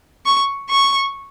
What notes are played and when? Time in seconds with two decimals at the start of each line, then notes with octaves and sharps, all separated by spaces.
0.26 C#6
0.70 C#6